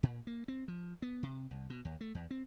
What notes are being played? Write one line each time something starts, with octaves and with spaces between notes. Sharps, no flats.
A#2
A#3
C4
F3
B3
C3
C2
B2
D#2
A3
E2
C4